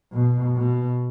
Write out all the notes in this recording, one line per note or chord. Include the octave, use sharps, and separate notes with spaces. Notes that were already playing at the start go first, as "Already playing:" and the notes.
B2
B2